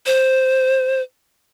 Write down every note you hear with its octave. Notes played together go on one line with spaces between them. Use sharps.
C5